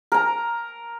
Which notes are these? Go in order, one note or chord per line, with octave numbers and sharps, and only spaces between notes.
A#4 A#5